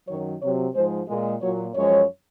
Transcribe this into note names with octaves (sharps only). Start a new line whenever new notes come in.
F#2 D#3 F#3 C#5
C3 F#3 C#5
G#2 F3 G#3 C5
A#2 G#3 G#4
A#2 F#3 C#5
F#2 F3 G#3 C#5